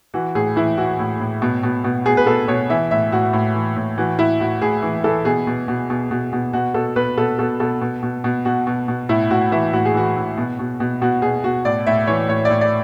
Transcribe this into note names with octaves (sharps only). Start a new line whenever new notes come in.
E3 F#4
A2 G#4
E3 E4
E3 F#4
A2
A2
B2
B2
B2
B2 G#4
B4
B2 A4
B2 C#5
E3 E5
A2 E5
A2 F#4
A2
E3
A2
E3 F#4
A2 E4
A2 F#4
A2 G#4
E3
E3 A4
B2 G#4
B2
B2
B2
B2
B2
B2 F#4
B2 A4
B2 B4
B2 A4
B2 A4
B2 A4
B2
B2
B2
B2 F#4
B2
B2
A2 E4
A2 F#4
E3 E4
A2 F#4
G#4
E3 F#4
A2
B2
B2
B2
B2 F#4
B2 G#4
B2 F#4
A2 D5
A2 E5
E3 C#5
A2 C#5
D5
A2
D5